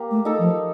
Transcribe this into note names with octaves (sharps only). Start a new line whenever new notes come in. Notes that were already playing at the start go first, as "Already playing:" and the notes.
Already playing: A#3 G4
A3
D#4 A4
F3